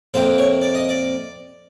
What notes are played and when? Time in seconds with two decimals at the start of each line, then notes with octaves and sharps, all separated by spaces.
0.14 F2 C3 F3 A#3 C5
0.38 C#5
0.61 D5
0.75 D#5
0.89 D5